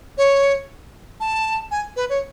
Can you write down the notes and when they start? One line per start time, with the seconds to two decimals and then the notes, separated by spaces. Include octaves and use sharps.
0.18 C#5
1.20 A5
1.71 G#5
1.96 B4
2.09 C#5